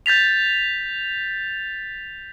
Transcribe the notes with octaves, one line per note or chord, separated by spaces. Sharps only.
G6 A6 B6 F7